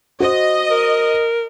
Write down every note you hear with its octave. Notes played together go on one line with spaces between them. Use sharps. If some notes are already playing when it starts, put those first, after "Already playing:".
F#4 C5 D#5
A#4